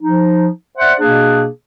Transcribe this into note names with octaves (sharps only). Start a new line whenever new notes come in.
F3 D#4
C5 D5 E5 F#5
B2 A#3 D4 G#4